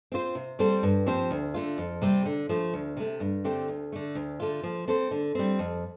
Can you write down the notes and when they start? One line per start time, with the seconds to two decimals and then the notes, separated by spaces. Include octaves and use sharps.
0.12 C4 F4 C5
0.35 C3
0.59 G3 C4 A4 C5
0.83 G2
1.06 F3 C4 G4 C5
1.31 D2
1.54 D3 A3 F4
1.78 F2
2.02 C3 G3 C4
2.26 D3
2.49 F3 A3
2.74 D2
2.97 C3 A3
3.20 G2
3.44 D3 A3 C4 G4
3.68 D2
3.92 D3 A3
4.15 D2
4.40 D3 A3 F4
4.63 F3
4.88 C4 A4 C5
5.11 D3
5.35 G3 C4
5.59 F2